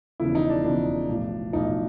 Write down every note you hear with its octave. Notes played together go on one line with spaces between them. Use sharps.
E1 E2 C#3 F3 E4
D#4
D4
E1 E2 C#3 F3 D4
B1 A2 F3
B1 A2 F3 D#4